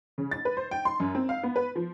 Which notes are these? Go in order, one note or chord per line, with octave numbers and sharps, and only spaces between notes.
C#3
A6
B4
C5
G5
C6
F#2
C4
F5
B3
B4
F3